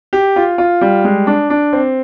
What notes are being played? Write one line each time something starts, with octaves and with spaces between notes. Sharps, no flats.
G4
F4
F4
G3
G#3
D4
D4
C4